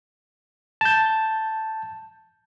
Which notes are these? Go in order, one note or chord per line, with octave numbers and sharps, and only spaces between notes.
A5 G6